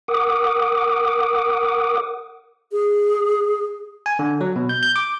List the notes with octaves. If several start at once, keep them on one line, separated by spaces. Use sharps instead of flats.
A#4 F#5 D6 D#6
G#4
G#5
D3
F#3
B2
G6
G6
D6